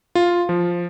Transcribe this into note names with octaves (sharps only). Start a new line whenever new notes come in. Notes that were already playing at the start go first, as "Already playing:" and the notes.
F4
F3